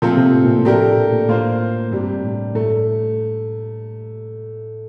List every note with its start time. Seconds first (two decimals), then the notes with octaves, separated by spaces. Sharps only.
0.02 A#2 F3 A3 C4 F4 A4
0.17 C3
0.34 A2
0.45 A#2
0.58 A2
0.65 A3 D4 G4 A#4
0.97 A#2
1.12 A#2
1.29 A2 A#3 F4 C5
1.91 G2 C3 G3 D4
2.24 A2
2.55 A2 A3